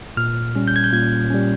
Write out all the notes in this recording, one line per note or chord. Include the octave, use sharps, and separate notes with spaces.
A#2 F6
G3 C#4
G6
G#6
G6
A#2 G#6
G3 C#4